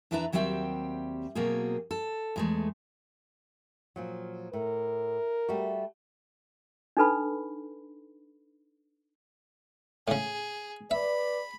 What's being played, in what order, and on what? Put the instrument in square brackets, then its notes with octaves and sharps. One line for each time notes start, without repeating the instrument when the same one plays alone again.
[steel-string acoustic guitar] E2 D4 E4 B4 E5 A#5
D#2 F#3 G3 C4 E5 G5
B2 F#3 A#3 C4 G#4
A4
E2 G#3 A3
[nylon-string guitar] A#2 F3 F#3
[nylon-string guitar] A2 [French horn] A#4
[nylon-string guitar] G3 A3 F#4
[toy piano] D4 D#4 A4 B4 B5
[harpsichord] A2 C#3 [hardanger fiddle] G#4
[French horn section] B4 D5 [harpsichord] E5 [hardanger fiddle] B5